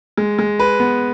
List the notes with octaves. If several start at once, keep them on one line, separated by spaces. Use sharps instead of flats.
G#3
G#3
B4
B3